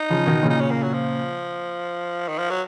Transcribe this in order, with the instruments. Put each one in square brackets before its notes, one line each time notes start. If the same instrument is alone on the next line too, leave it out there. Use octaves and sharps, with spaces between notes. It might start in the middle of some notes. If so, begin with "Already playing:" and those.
Already playing: [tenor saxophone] D#4
[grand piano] C#3 F3
B2 D#3
A#2 C#3
[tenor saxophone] D#4
C#4
A#3
F#3
F3
D#3
F3
F#3